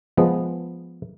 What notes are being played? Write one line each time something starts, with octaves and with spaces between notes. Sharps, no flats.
F3 G#3 B3